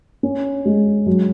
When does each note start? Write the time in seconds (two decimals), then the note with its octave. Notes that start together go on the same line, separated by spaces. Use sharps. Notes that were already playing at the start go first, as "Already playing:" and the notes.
0.23 C#4
0.65 G#3
1.07 F#3